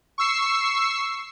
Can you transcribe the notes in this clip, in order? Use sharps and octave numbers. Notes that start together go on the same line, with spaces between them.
C#6 E6 C7